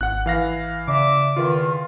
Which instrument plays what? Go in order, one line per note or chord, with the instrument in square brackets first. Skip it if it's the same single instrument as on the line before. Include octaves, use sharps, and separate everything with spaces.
[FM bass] G#1 [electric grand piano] F#5 F#6
[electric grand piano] E3 F5 A#6
[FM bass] C#3 [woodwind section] D5 E5 D6
[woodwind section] E2 D#3 [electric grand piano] F4